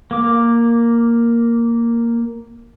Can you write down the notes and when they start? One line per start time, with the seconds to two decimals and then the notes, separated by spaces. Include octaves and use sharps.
0.11 A#3 D6